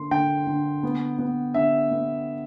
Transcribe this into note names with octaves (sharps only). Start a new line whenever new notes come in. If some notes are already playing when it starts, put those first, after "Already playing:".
Already playing: D3 A#3 C6
D3 G5
D3
B3
B3
D3 E5
B3